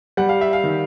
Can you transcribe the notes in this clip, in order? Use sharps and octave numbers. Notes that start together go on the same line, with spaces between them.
G3 F#5
F5
E5
F5
D#3